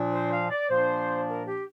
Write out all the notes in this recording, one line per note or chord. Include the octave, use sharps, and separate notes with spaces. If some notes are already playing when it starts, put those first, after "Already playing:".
Already playing: A#2 F3 D4
C5
F5
D5
A#2 F3 A#3 D4 C5
A#4
G4